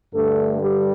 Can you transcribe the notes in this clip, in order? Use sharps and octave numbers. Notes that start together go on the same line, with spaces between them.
G2 D3 A3 A4
G3 G4